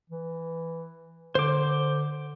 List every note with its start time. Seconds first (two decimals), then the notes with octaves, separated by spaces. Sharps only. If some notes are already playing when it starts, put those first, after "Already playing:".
0.10 E3
1.35 D3 C5 D6